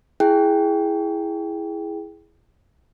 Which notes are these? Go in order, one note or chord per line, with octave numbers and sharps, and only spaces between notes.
E4 G#4 G5